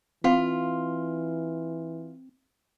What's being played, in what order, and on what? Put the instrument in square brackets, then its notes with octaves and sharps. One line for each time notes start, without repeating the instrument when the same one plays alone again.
[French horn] E3 [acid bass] C4 [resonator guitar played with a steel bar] F4 [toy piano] F5